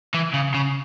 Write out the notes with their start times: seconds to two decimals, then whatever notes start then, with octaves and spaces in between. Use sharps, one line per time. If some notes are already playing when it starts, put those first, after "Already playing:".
0.14 E3
0.34 C#3
0.54 C#3